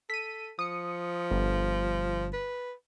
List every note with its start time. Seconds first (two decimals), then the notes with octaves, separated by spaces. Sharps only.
0.10 A4 B6 D#7
0.59 F3 D#6 C#7
1.31 G1
2.33 B4